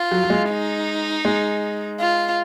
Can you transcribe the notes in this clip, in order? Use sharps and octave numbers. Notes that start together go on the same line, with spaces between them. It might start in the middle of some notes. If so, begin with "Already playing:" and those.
Already playing: F4
F#3
F#3
G#3
D#4
G#3
F4